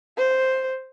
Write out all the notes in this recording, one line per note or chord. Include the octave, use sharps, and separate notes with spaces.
C5